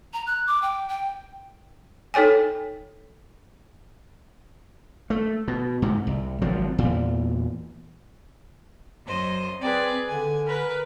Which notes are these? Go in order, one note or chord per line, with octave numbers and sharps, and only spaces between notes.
A#5
F#6
D6
G5
G5
D#4 A4 C#5 G5 G#5
A3
B2
G#2 C3
C2
G#1 F3 F#3 C4
E2 A#2
F#2 C5 D#5
C4 G#4 B4 D5
D3 G#5
A#4 B4 B5